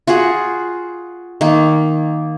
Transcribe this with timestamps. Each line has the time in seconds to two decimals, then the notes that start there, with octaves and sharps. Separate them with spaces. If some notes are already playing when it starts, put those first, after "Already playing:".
0.07 F4 F#4 G#4 F#5
1.41 D#3 A#3